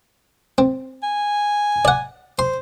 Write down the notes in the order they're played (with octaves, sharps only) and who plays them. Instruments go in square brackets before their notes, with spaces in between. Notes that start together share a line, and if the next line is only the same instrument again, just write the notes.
[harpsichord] C4
[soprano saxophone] G#5
[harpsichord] D5 F#5
[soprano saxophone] C5 [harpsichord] C6